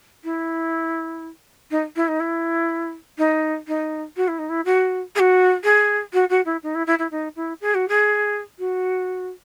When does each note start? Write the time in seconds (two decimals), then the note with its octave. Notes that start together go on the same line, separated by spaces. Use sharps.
0.24 E4
1.71 D#4
1.96 E4
2.08 D#4
2.20 E4
3.18 D#4
3.68 D#4
4.17 F#4
4.28 E4
4.39 D#4
4.49 E4
4.65 F#4
5.15 G#4
5.19 F#4
5.64 G#4
6.13 F#4
6.30 F#4
6.45 E4
6.63 D#4
6.75 E4
6.87 E4
6.99 E4
7.11 D#4
7.36 E4
7.61 G#4
7.75 F#4
7.88 G#4
8.59 F#4